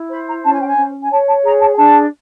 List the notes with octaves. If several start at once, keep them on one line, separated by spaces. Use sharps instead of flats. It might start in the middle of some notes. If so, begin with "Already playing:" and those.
Already playing: E4
C5 B5
A#5
C#4 A5
G#5
G5
G#5
C#4
G#5
C#5 A5
A5
G#4 A#5
A5
G#5
D4 A5